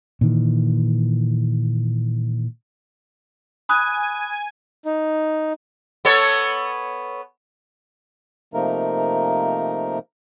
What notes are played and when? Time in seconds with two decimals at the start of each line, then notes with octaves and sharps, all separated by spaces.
0.21 A#2 D#3 E3
3.69 G#5 B5 D#6 F#6
4.85 D#4
6.05 B3 A4 C#5
8.54 C3 F3 A3 A#3 D#4 A#4